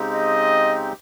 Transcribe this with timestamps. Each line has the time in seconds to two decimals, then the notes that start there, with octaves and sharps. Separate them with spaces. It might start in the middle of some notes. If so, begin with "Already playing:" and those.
Already playing: C#3 G#3 C4 D#4 G4
0.14 D#5